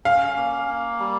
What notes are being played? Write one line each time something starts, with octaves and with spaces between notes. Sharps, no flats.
C#4 F5
A#3
A#3
G3